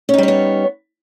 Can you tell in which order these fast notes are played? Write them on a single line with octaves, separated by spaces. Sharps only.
C#4 D#4 G3 C#5 B3